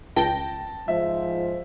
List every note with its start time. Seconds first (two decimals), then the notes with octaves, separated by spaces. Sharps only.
0.16 C#2 G5 A5 A#6
0.88 G#2 F3 E5